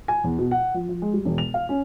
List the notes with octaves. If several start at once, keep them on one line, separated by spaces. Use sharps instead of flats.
G#5
E2
B2
F#5
F3
F3
G#3
G3
E1
F7
F5
C#4